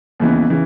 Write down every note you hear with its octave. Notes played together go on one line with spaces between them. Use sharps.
D#2 C#3 E3 B3
C#3 E3